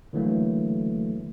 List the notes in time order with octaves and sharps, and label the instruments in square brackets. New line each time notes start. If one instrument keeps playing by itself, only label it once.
[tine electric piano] D3 E3 F#3 A3 A#3